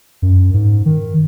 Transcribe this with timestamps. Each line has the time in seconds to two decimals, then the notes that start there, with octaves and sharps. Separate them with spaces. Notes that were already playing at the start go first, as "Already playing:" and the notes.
0.22 F#2
0.54 G#2
0.86 D#3